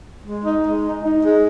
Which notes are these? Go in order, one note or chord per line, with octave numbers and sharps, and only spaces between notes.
G#3
D#4
G#3
D#4
D#4
G#3